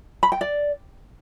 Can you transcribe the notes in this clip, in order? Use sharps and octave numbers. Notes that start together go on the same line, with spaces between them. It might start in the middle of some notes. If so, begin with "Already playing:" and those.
B5
G5
D5